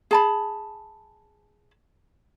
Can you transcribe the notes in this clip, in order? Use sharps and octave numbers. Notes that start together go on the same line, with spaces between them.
G#4 A5 B5